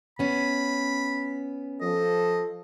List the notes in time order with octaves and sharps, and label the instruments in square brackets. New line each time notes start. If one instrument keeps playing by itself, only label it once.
[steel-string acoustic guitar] B3 C#4 [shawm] B5
[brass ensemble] F3 A4 [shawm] D#5